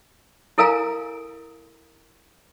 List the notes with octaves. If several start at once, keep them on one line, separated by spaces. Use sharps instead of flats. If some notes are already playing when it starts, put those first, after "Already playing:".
E4 A4 A#4 F5 G#5 A#5